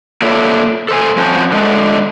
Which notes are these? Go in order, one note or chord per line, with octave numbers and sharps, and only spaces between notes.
A#3 D4 F4 A4 C#5 E5
A4 C5 G#5
F3 C4 C#4 F#4 C5 A5
D3 G#3 A3